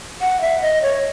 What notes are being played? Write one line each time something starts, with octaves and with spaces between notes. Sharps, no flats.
F#5
E5
D#5
C#5